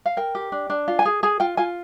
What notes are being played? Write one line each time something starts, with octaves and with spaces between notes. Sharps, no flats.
F5
A#4 G5
G4
D4
D4
F4
G#5
G#4
G#4 G#5
F4 G5
F4 G#5